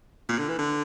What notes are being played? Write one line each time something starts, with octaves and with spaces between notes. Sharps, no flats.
A#2
D3
E3
D3